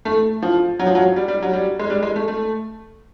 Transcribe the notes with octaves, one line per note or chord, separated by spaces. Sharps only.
A3
F3
F#3
F3
F#3
G3
G3
F#3
G3
G#3
G3
G#3
A3
A3